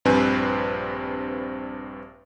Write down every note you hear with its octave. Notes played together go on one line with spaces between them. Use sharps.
A#1 G2 C4 B4 C5 G#5